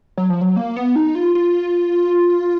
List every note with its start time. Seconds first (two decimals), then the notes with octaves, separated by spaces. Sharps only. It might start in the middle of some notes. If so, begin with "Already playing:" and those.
0.18 F#3
0.29 F3
0.41 F#3
0.56 A#3
0.77 B3
0.96 D#4
1.15 F4
1.35 F4